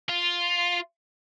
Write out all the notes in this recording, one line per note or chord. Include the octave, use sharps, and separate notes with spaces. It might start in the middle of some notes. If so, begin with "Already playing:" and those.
F4